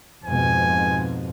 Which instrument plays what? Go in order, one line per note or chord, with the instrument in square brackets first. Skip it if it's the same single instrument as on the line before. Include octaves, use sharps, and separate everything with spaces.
[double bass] F2 C4 [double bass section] G#2 B2 [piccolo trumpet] G#5